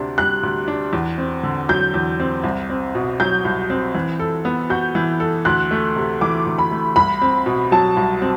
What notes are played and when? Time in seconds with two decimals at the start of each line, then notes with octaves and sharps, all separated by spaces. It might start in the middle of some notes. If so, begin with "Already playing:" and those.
Already playing: D2 C3 D4
0.18 G3 F#6
0.43 D2
0.68 D4
0.93 E2
1.18 C4
1.43 D3
1.69 F#3 G6
1.94 E2
2.20 C4
2.44 C2
2.70 C4
2.95 B2
3.20 F#3 G6
3.45 C2
3.70 C4
3.95 E3
4.20 A4
4.45 B3
4.70 F#4 G6
4.95 E3
5.20 A4
5.45 D2 F#6
5.71 A3
5.96 C3
6.21 E3 D6
6.46 D2
6.58 B5
6.71 A3
6.96 C2 B5
7.22 C4
7.46 B2
7.72 F#3 A5
7.97 C2
8.22 C4